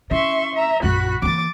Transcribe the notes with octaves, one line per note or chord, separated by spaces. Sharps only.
C#4 E4 E5 C6 C#6
E5 A#5
A#1 F#2 F#4 B5 F#6
E3 A#3 D6 A6